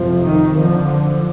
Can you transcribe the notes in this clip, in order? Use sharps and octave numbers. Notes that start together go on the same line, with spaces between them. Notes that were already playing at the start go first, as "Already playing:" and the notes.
Already playing: F2 C3 F3
D#3
D3 F3